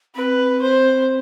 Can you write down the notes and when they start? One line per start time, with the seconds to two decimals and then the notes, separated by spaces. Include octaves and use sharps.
0.15 C4 B4
0.62 C5